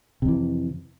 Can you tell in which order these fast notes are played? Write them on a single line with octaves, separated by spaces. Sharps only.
C3 F2 E3